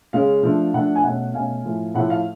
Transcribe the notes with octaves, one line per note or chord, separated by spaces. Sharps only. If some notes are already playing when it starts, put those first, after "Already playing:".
C#3 G#3 C#4 F5
F3 A3 D4
F3 A3 D4 F#5
G#5
B2 A3 C#4 F#5
B2 A3 C#4 F5 G#5
A2 F3 A3
A2 F3 A3 F#5
F5